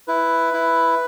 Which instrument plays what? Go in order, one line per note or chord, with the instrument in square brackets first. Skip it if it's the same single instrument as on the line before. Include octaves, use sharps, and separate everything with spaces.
[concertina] E4 B4
E4